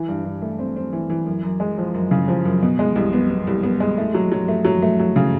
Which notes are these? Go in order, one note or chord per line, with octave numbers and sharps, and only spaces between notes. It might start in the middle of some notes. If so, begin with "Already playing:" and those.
Already playing: E3
G2
G2
A3
C4
C4
E3
E3
F#2
F#2
G#3
F3
F#2
C#3
F3
F#2
B2
G#3
C2
B3
B3
C2
B3
G#3
A3
F#3
F#3
A3
F#3
A3
F#3
C#3